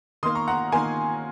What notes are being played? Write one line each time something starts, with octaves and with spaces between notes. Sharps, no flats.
D#3 A#3 C6 D#6
A#5 C#6
F#5 A#5
D#3 A#3 G#5 C6